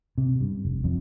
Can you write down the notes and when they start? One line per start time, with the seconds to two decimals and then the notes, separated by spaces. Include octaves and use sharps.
0.18 C3
0.41 G2
0.65 F1
0.84 F2